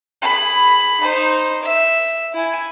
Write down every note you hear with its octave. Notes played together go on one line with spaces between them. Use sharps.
G#4 B5
D#4 C5
E5
E4 G#5